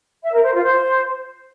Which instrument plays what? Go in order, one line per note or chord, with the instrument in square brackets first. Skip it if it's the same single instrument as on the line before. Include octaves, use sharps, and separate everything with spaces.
[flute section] E5
A#4
C5
F4
C5